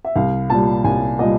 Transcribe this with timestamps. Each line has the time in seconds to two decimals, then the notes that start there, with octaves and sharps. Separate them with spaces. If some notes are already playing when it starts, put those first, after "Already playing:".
0.05 E5
0.16 C2 F5
0.50 A#2 G3 A5
0.84 C2 G#5
1.19 A#2 G3 D#5